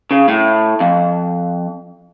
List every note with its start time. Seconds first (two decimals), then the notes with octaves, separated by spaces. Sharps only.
0.11 C#3
0.28 A2
0.80 F2